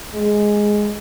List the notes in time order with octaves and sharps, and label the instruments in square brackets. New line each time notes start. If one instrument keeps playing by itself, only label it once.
[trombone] G#3